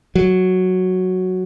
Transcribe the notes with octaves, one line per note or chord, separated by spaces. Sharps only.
F#3